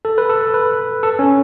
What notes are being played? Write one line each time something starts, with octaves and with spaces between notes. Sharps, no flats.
A4
B4
A4
B4
A4
C#4